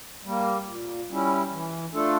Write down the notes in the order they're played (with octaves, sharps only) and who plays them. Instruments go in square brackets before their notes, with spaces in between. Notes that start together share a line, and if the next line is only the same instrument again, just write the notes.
[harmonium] G3 A#3
A#2
G3 C#4 E4
E3
A3 D4 F4 A4